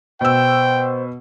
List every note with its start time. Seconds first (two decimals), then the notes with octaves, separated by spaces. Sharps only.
0.21 B2 C5 G5 E6